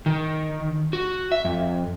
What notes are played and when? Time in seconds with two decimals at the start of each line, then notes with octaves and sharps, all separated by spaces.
0.06 D#3
0.93 F#4
1.32 E5
1.45 F2